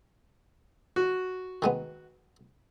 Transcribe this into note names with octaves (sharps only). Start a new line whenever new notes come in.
F#4
D#3 G#3 B3